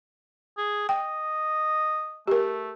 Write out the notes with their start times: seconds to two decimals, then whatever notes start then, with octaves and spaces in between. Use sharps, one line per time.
0.58 G#4
0.89 D#5 G5
2.28 A3 G4 A#4